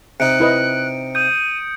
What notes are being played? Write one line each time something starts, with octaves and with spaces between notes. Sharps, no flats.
C3 D#4 F#6 C#7 D7
E4 B4 D#5
D#6 G6 D#7